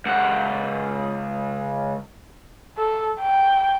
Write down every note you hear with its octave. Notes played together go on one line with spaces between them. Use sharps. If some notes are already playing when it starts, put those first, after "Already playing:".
C#2 F#5
A4
G5